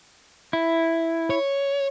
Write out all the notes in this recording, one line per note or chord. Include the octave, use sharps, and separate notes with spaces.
E4
C#5